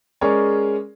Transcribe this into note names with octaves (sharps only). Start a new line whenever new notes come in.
G#3 C#4 G#4 A#4 C#5 D5